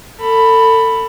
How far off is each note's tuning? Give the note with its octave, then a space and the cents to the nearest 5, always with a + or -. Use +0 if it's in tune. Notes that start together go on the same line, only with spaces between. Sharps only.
A4 +30 B5 +0